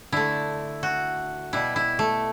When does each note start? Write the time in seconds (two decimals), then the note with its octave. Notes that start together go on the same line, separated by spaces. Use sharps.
0.12 D3 A3 E4
0.83 F#4
1.53 B2 G3 E4
1.76 E4
1.99 A3